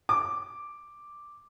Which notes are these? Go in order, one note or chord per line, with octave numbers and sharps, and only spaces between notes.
D6